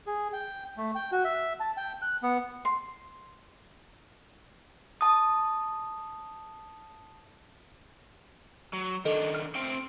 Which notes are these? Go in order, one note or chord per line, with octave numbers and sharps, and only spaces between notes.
G#4
G5
A3
G5
F#4
E5
A5
G5
F#6
B3
C6
A5 D#6
F#3
D#3 D4 A4 D#5
F6
A3 C4 G5